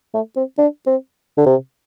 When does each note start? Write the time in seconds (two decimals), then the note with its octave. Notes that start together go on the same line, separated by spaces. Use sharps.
0.14 A3
0.36 C4
0.58 D4
0.87 C4
1.38 D3
1.46 C3